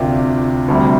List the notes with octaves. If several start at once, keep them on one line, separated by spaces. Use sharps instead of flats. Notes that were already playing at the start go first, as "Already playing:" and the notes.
Already playing: D2 C3 A#3 D4 F4
D2 C3 G3